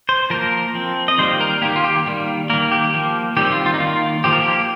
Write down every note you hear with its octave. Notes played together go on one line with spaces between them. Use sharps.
C5
F3 A#3 A#4
F3 C4
D#5
D#3 G3 A#3 C5
A#4
D#3 A#3 G4
F4
G4
D#3 G3 A#3
D#3 A#3 A#4
G4
F3 A#3
D#3 G3 C4 G4
F4
F4
D#4
D#3 A#3 F4
F3 A#3 G4
A#4
G4